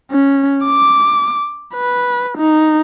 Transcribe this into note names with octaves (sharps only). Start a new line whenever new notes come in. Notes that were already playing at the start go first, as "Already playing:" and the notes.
C#4
D6
B4
D#4